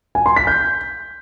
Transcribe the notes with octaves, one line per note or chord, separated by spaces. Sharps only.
G#5
C6
B6
G6